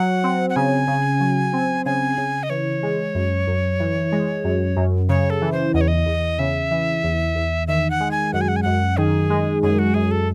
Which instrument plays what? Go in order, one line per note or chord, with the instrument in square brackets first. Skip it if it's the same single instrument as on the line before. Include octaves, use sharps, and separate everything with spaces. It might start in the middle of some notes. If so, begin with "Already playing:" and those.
Already playing: [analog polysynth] F#3 [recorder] F#5
[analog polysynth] C4
[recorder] F#5
[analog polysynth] C#3 [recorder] G#5
[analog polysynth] C#3
F#3
C4
[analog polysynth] C#3 [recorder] G#5
[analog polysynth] C#3
[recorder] D#5
[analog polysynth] E3 [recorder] C#5
[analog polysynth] G#3
F#2
F#2
E3
G#3
F#2
F#2
[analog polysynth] C#3 [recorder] C#5
[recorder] A4
[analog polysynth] E3
[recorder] C5
[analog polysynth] E2 [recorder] D#5
[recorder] C#5
D#5
[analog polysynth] E2
[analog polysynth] C#3 [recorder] E5
[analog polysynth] E3
E2
E2
[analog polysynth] D#3 [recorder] E5
[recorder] F#5
[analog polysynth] G#3
[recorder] G#5
[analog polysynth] F#2 [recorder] F#5
[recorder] G#5
F#5
G#5
[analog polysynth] F#2 [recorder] F#5
[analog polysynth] D#3 [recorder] G#4
[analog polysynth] G#3
[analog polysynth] F#2 [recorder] G#4
[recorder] F#4
[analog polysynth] F#2 [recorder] G#4
[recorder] A4